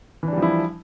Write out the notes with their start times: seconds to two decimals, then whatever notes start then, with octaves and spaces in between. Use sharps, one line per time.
0.23 E3
0.28 D4
0.33 G3
0.38 F3
0.42 E4